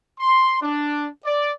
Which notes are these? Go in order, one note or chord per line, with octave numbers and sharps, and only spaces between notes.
C6
D4
D5